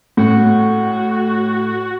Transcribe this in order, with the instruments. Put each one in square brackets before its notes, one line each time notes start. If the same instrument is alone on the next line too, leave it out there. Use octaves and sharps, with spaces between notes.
[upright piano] A2 [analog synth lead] F#4